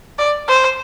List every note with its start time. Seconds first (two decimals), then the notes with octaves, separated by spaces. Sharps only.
0.19 D5
0.48 C5